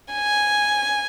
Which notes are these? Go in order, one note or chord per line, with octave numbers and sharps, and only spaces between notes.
G#5